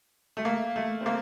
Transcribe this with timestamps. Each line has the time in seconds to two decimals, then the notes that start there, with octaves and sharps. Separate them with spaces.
0.37 A3
0.45 A#3
0.76 A3
1.01 C4
1.06 A#3